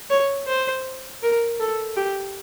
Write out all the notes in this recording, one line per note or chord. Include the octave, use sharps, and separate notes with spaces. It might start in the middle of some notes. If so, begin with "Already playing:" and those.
C#5
C5
A#4
A4
G4